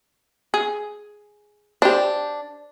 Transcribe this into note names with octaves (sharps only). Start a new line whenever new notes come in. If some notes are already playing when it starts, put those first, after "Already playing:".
G#4
D4 G4 C5